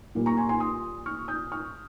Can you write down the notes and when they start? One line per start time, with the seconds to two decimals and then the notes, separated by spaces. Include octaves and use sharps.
0.15 A#2 G3 A#3
0.26 A#5 C#6
0.37 G#5 C6
0.49 G#5 C6
0.60 C6 D#6
1.06 C#6 F6
1.28 D#6 G6
1.52 C#6 F6